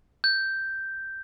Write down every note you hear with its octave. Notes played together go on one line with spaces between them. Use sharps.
G6